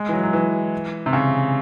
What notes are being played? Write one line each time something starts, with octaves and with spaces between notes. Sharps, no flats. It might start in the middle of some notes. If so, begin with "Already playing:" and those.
Already playing: G#3
E3
F#3
F#3
E3
C3
C#3